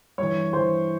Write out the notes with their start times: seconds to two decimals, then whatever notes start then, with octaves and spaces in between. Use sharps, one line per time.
0.18 G2 E3 C#5
0.53 G2 E3 C5